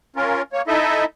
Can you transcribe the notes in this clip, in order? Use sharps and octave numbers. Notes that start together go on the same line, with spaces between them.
C#4 F4 A#4
A#3 C#5
D#4 E4 A4 D#5 E5